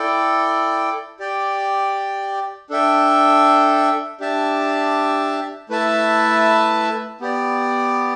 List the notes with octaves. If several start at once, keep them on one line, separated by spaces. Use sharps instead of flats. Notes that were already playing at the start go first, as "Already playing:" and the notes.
Already playing: E4 A4 D5 G5
G4 D5 G5
D4 A4 E5 G5
D4 G4 E5 A5
A3 E4 B4 E5 A5
B3 G4 D5